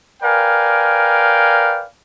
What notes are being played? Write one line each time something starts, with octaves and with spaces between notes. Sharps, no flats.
A#4 B4 D5 F5 G5 G#5